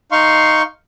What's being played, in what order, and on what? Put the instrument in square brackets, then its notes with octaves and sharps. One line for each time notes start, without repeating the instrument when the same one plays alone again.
[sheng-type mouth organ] D#4 F5 C6 C#6